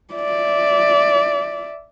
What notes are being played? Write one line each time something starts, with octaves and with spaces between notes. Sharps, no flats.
D5 E5